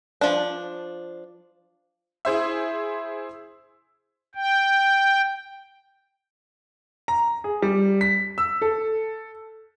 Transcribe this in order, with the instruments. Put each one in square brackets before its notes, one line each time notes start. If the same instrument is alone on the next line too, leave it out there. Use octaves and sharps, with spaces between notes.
[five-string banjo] F3 D4
[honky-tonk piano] E4 G#4 C5 E5
[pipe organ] G5
[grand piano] A#5
G#4
G3
B6
E6
A4